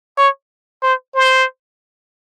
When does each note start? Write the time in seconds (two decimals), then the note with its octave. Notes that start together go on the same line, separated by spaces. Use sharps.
0.18 C#5
0.83 C5
1.15 C5